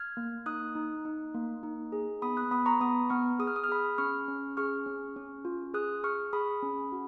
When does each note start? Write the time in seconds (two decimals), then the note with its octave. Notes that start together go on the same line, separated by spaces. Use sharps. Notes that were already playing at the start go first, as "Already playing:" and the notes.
Already playing: F6 G#6
0.17 A#3
0.46 D#4 D#6 F#6
0.75 D#4
1.05 D#4
1.34 A#3
1.63 D#4
1.92 G#4
2.22 B3 B5 D#6
2.37 D#6 F#6
2.51 B3 B5 D#6
2.66 A#5 C#6
2.81 B3 B5 D#6
3.10 B3 C#6 F6
3.39 G#4 D#6
3.47 F6
3.56 D#6
3.64 F6
3.69 G#4 B5 D#6
3.98 C#4 C#6 F6
4.28 C#4
4.57 G#4 C#6 F6
4.86 C#4
5.16 C#4
5.45 F4
5.74 G#4 D#6 F#6
6.04 G#4 C#6 F6
6.33 G#4 B5 D#6
6.62 C#4
6.92 F#4